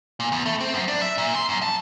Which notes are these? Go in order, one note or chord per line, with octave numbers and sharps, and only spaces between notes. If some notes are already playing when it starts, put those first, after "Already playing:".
A#2
E2
A3
C4
F#2
D4
E5
A#2
C6
F#2
A5